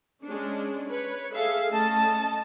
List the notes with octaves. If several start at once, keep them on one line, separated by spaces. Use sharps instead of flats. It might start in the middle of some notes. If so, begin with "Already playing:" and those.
G#3 C#4 D4
B4 C#5
G#4 A4 E5 F5
A3 C#4 D#5 A5